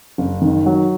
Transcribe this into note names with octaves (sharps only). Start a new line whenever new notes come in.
F#1
D#3
F#3